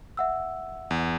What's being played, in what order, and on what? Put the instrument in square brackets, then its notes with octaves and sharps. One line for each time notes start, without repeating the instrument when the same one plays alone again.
[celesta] E5 F#5 E6
[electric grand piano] E2